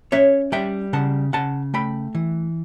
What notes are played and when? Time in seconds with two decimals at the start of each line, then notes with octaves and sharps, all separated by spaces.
0.12 C#4 C#5 E5
0.52 G3 E5 G5
0.93 C#3 F#5 A5
1.33 C#3 F#5 A5
1.74 A3 G5 B5
2.15 E3